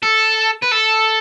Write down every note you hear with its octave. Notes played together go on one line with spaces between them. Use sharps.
A4
B4
A4